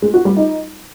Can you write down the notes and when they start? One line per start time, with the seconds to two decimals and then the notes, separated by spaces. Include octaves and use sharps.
0.02 G#3
0.14 F#4
0.25 G3
0.37 D#4